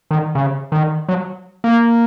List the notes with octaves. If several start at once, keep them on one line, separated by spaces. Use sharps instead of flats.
D#3
C#3
D#3
F#3
A#3